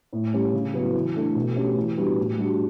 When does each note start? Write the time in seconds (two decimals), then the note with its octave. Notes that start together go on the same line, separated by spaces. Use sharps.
0.13 A2
0.33 G3 C#4 G4
0.53 C#3
0.74 F#3 B3 E4
0.95 E3
1.15 A3 D4 A4
1.35 B2
1.56 A3 C#4 G4
1.76 E3
1.97 G3 B3 D4 F#4
2.17 A2
2.38 G3 D4 F#4